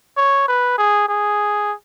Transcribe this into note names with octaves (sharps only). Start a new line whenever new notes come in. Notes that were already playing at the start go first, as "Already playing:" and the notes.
C#5
B4
G#4
G#4